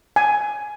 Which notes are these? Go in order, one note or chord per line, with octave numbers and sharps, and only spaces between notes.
G#5